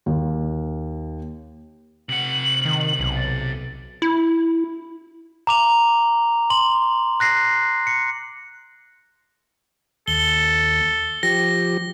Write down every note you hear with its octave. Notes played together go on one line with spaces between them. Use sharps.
D#2
C3 F#5 F#7
D#3
B1
A6
E4
A#5 D6 F7
C6 F#7
F#6 A#6 C7
C#7
D#2 A4 G7
F3 G4 A#6